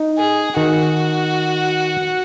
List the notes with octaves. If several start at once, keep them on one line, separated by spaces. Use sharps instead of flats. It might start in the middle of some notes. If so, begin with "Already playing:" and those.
Already playing: D#4
G#4
D#3 F#4